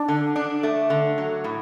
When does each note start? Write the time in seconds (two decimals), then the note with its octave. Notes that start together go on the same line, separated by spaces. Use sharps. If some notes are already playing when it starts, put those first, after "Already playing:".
Already playing: D4
0.08 D3
0.36 D4
0.63 A3
0.90 D3
1.18 F#3
1.44 A2